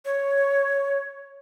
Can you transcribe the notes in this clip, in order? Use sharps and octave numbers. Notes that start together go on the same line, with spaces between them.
C#5